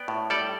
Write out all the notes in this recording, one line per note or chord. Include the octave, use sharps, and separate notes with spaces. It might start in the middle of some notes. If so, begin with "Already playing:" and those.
Already playing: B3 D5 G5
A2
G3 A4 D5